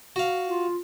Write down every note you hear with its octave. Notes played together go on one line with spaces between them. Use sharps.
F#4 F5
F4